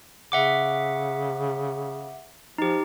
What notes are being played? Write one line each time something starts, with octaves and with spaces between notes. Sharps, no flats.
C#3 E5 F#5 D6
F3 D#4 G4